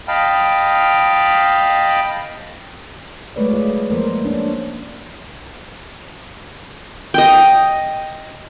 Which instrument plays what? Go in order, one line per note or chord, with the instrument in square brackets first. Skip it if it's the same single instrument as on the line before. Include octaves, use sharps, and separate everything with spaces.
[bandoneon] D#5 F5 G5 A5 B5 F6
[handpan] F#3 G#3 A3 B4 C#5 D5
F4 D#5
F3 A#3 A#4 C5
C#4 D4
[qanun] D#5 G5